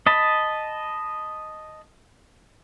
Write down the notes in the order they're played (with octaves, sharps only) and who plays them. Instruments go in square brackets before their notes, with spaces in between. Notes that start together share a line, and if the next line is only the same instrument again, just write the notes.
[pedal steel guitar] D#5 A5 B5